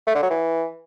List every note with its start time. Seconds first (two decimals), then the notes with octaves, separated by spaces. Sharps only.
0.07 A3
0.15 D3
0.22 F#3
0.30 E3